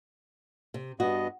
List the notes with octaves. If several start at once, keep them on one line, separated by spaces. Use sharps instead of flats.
C3
G2 B3 F#4 D#5